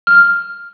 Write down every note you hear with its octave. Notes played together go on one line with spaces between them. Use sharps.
F6